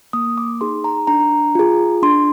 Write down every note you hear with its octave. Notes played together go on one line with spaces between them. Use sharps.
A#3 D#6
D6
D#4 G#4 C6
A#5
D4 A#5
F4 G#4
D4 C6